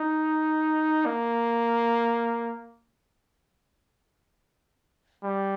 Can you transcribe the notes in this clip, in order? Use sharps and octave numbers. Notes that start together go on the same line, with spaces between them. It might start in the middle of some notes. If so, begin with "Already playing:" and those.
Already playing: D#4
A#3
G3